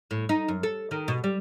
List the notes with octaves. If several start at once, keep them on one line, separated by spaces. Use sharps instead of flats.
A2
D#4
F#2
A4
D#3
B2
G3